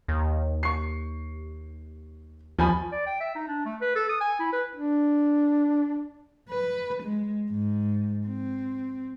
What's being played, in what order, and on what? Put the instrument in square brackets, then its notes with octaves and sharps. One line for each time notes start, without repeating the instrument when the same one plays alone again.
[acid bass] D#2
[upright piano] C#6 C7
[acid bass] D#2 [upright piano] F3 G#5 B5
[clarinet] D5
G5
E5
D#4
D4
A3
B4
A4
D#6
G#5
E4
B4
[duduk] D4
[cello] B4
G#3
G#2
C4